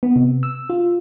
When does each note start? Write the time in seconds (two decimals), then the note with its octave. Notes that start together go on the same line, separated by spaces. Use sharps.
0.03 B3
0.16 C3
0.43 E6
0.70 F4